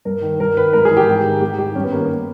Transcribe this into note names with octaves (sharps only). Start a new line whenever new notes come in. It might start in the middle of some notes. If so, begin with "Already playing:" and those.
G2 A#4
D#3
G2 A#4
D#3 B4
G#2 A#4
G#4
E3
G4
G#2
D#3
G#2 G4
D#3 G4
G2 C#4
B3
D#3 A#3
B3